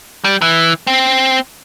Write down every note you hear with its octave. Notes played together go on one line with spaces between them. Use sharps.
G3
E3
C4